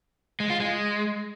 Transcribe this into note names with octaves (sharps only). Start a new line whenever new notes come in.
G#3
F4
G#3